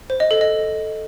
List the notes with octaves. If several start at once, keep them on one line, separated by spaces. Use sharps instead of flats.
C5
D#5
A4
D#5